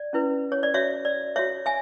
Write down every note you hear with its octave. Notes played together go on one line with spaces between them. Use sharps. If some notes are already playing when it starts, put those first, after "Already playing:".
Already playing: D5
C#4 E4 B4
C#5
D5
F#4 C#5 E5
D5
F#4 C#5 E5
E5 G#5